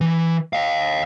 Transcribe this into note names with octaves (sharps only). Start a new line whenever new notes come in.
E3
D#5 F5